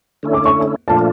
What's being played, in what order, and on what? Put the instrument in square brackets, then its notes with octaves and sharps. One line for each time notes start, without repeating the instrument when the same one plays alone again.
[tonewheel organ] D3 A3 C#4 E4
[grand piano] D6
C#6
[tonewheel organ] A#2 F3 A3 D4 F4 [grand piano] A5